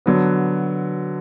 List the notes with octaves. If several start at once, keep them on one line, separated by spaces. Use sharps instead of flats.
D3 F#3 B3